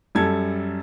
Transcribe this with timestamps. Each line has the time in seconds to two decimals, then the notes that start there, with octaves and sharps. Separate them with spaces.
0.15 F#2 G3 A4 G#6